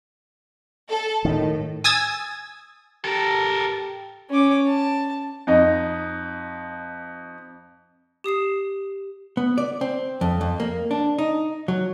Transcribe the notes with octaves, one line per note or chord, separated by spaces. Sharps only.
A4
A2 D#3
G#5 D#6 E6 G#6 A6
G4 A4 A#4
C#4 D6
A5
F2 D#4 D#5
G4 D#6 C7 E7
B3
D5
C4
F2
F2
A#3
D4
D#4
F#3